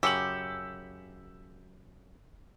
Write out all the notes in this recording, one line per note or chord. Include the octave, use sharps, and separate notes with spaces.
F#2 C#3 G4 E6 C#7 F#7